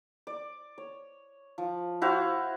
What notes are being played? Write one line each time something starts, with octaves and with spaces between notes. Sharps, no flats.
D5
C#5
F3
E4 F#4 C5 F5